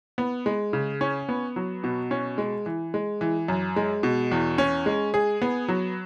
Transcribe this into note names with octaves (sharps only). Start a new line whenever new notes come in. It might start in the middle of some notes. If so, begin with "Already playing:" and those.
B3
G#3
C#3
C#4
B3
F#3
B2
C#4
G#3
E3
G#3
E3
F#2
G#3
B2
E2
C#4
G#3
G#4
B3
F#3